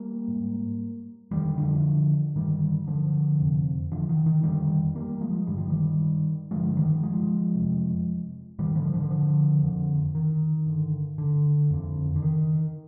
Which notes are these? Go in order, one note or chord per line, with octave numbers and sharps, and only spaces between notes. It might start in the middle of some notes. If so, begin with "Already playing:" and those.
Already playing: G3 A#3
G#2
F2 D3 D#3 G3
D3 F3
G2 D3 D#3 G3
D3 F3
F2 C3
D3 F3
D#3
D#3
F2 D3 D#3 G3
G3 A#3
F3 G#3
G2 D3 G3
F3
D#3 G3
G2 D3 F3 G#3
D#3 G3
F3 G#3
F2 C3
G#2 D#3 G3
D3 F3
D3 F3
D3 F3
F2 D3
D#3
G2 D3
D3
F2 D3
D3
D#3